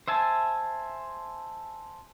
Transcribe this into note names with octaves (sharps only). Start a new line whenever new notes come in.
C5 E5 G#5 A5